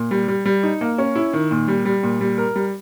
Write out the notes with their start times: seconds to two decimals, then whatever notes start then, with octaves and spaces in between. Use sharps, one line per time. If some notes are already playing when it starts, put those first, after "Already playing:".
Already playing: A#2
0.11 G3
0.28 G3
0.46 G3
0.63 D#4
0.81 A#3
0.98 C#4
1.16 E4
1.33 D#3
1.51 A#2
1.68 G3
1.85 G3
2.03 A#2
2.21 G3
2.38 A#4
2.56 G3